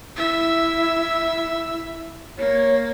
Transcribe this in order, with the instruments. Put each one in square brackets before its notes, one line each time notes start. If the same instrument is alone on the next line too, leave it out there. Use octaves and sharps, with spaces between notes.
[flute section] E4 [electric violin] E5
[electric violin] A#3 [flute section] C#5